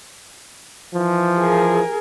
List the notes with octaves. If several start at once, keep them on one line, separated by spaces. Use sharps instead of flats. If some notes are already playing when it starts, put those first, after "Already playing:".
E3 F3
G#4 A#4